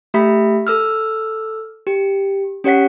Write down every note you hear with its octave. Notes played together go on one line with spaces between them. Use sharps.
A3 G4 E5 B5 B6
A4 E6 F6
G4
C#4 G4 C#5 F#5 B6